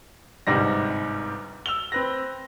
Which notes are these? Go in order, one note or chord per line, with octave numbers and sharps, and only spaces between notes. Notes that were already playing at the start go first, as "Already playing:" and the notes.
G1 G#2 C3 G3 A#6
E6 F7 G7
C4 B4 A#6